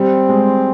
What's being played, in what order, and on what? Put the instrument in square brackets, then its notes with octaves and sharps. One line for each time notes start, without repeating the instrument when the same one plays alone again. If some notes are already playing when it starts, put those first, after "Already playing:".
Already playing: [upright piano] G3 [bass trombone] C4
[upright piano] G#3